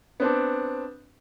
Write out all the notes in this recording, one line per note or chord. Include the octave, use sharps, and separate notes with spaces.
B3 C4 D4